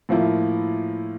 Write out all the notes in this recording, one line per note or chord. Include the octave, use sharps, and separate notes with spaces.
A2 F3 A#3 E4